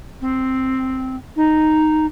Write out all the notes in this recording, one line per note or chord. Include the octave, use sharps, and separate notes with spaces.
C4
D#4